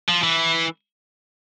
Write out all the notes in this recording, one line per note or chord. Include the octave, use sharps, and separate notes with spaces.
F3
E3